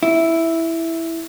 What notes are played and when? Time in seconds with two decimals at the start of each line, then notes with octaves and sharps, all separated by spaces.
0.03 E4